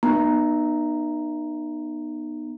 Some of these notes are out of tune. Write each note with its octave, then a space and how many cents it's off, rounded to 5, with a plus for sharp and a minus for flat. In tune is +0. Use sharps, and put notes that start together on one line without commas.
B3 -30 D#4 -30 A#5 +0